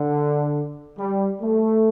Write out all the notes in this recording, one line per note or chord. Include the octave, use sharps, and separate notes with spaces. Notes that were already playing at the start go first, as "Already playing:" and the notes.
Already playing: D3
G3
A3